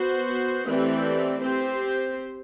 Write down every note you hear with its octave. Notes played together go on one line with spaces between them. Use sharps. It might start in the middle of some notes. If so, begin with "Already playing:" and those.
Already playing: B3 F#4 C5
E3 A3 C4 G4 D5
C4 G4 C5